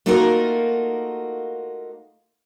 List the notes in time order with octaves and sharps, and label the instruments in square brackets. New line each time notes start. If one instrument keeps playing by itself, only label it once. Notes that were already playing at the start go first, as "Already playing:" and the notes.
[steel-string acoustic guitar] A3 A#3 D#4 F4 F#4 A#4